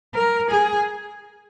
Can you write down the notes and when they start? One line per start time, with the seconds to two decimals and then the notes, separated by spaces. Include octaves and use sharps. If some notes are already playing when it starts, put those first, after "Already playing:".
0.14 A#4
0.50 G#4